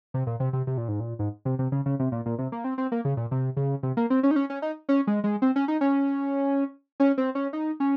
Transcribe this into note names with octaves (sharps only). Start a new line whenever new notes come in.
C3
A#2
C3
C3
C3
A#2
G#2
A#2
G#2
C3
C3
C#3
C#3
C3
A#2
A#2
C3
A#3
C4
C4
A#3
C#3
A#2
C3
C#3
C3
A#3
C4
C#4
D#4
C#4
C#4
D#4
C#4
G#3
G#3
C4
C#4
D#4
C#4
C#4
C4
C#4
D#4
C#4